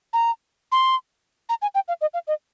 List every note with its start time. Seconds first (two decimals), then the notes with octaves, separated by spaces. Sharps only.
0.13 A#5
0.72 C6
1.49 A#5
1.62 G#5
1.75 G5
1.88 F5
2.01 D#5
2.14 F5
2.27 D#5